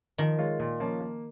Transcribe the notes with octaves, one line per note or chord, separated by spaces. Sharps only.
D#3 F3
G#3 F4 C#5
A#2
F3 A#3 C#4
A#3